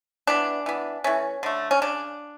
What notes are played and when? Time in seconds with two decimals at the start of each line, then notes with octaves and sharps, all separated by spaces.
0.27 E3 B3 D4
0.66 E3 B3
1.04 E3 A3 C#4
1.43 D3 A3
1.71 C#4
1.82 C#3 D4